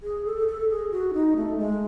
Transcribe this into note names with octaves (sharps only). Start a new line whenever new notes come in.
G#4
A4
A4
G#4
F#4
D#4
A3
G#3